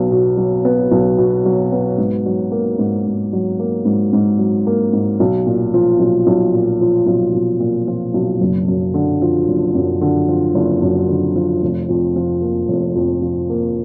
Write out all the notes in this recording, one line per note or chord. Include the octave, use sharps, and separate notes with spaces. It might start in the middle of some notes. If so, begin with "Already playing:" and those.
Already playing: B1 F#3 B3
B2
F#3
B3
B1
B2
F#3
B3
G#2
F#3
A#3
G#2
G#2
F#3
A#3
G#2
G#2
F#3
A#3
G#2
B1
A#2
F3
B1
B1
A#2
F3
B1
B1
A#2
F3
B1
F#1
F#2
D3
F3
F#1
F#2
D3
F3
F#1
F#2
D3
F3
F1
F2
F3
A#3
F1
F2
F3
A#3